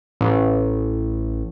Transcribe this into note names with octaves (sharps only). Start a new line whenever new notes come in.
A1